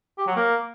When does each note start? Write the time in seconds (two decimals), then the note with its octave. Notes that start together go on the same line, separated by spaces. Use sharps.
0.18 G4
0.27 F#3
0.36 A#3